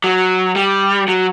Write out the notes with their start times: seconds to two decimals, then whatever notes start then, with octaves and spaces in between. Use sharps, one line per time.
0.04 F#3
0.56 G3
1.08 F#3